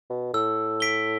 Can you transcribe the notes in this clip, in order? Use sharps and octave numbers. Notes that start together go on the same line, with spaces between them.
B2
A2 E6
B6 D7 G7